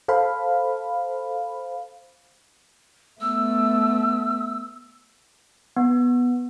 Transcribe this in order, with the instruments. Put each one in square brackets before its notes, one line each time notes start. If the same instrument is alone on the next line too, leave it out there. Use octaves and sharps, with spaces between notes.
[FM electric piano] A4 C5 F5 B5
[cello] A3 B3 [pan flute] E6
[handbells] B3